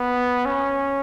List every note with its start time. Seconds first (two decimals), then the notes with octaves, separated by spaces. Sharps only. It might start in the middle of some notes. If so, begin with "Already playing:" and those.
Already playing: B3
0.46 C#4